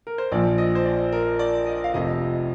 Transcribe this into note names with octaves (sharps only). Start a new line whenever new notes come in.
A#4
C5
A#1 A#2 F3 D5
D#5
C5
D5
A#4
D5
D#5
F5
F1 F2 C3 D#5